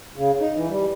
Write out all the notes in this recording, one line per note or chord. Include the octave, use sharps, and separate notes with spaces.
C#3
D#4
E3
G3